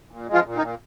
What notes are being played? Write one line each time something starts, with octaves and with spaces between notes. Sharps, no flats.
A#2
G#3
F3 F4
A#2
D#3 D#4
A#2